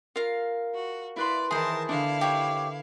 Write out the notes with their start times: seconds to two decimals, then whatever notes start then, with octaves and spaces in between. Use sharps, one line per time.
0.16 F4 A#4 F5
0.74 F#4
1.16 E4 B4 D5 C6
1.51 D#3 E3 G#4 A#4 C5 A5
1.89 D3 D4 E4 F5
2.21 G4 C#5